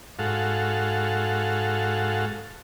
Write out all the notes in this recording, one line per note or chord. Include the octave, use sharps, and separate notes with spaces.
G#2 F#4 A4 F5